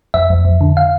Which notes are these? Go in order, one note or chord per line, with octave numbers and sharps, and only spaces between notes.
F2 E5
F2
F2
D3
F5